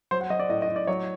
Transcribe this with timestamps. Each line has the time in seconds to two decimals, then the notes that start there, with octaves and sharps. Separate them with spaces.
0.11 F#3 C5
0.21 F#5
0.30 F#3 D#5
0.39 D5
0.49 A2 D#5
0.62 D#5
0.69 A2
0.76 D5
0.87 F#3 C#5